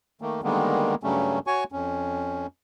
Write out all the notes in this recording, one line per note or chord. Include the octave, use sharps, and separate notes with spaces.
D#3 A3 A#3
D3 D#3 G3 G#3 A#3 B3
G2 C#3 F#3 G3 A3 C#4
F#4 C#5 G#5 C#6
F2 C#4